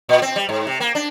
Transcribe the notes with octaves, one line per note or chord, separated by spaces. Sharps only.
A#2
C4
G3
G#2
C3
A#3
D4